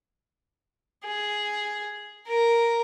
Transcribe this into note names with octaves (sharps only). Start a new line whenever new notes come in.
G#4
A#4